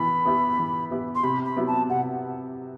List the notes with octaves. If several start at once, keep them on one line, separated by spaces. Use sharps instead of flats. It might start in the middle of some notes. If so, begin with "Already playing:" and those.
Already playing: E3 B3 B5
B3 E4 G4
E3
B3 E4 G4
C6
C3 B5
B5
F#3 B3 E4 G4
A5
C3 F#5